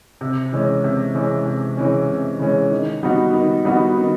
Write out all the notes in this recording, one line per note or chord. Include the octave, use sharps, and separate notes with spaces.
C3
E3 G#3 C#4
C3
E3 G#3 C#4
C3
E3 G#3 C#4
C3
E3 G#3 C#4
D#3
G3 B3 D#4 F#4
D#3
G3 B3 D#4 F#4
D#3